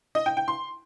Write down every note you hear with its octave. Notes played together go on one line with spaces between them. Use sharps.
D#5
G5
G5
C6